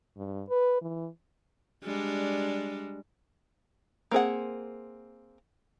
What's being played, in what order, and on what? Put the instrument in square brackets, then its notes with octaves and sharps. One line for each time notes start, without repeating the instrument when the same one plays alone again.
[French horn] G2
B4
E3
[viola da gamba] G3 G#3 D4
[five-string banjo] A#3 C4 G#4 F#5